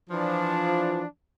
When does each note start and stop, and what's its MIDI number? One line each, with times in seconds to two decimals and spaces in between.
0.10 1.04 52
0.10 1.04 53
0.10 1.04 62